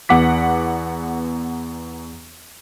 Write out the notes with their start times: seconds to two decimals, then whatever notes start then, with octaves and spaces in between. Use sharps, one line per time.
0.09 E2 B3 F#5 D6 B6